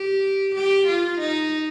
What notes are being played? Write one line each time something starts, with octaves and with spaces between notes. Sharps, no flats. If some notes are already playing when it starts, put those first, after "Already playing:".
Already playing: G4
G4
F4
D#4